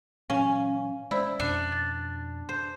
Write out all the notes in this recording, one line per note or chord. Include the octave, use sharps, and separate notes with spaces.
A#2 E3 F#3 C#4 F5 G#5
G#3 E4 C5 D5
F2 B2 D4
A6
C5